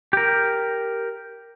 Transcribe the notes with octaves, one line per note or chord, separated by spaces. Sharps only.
G4 A#4